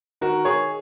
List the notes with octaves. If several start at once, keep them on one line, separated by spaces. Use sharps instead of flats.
D#3 F#4 A#4
D#3 G#4 C#5